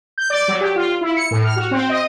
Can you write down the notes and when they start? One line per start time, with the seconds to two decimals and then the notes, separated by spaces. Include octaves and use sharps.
0.18 G6
0.30 D5
0.48 F#3
0.61 G4
0.76 F4
1.01 E4
1.17 C#7
1.31 A2
1.44 F6
1.56 F#4
1.71 C4
1.89 D#5